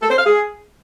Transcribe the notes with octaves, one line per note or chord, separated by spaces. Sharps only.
A4
C5
F5
G#4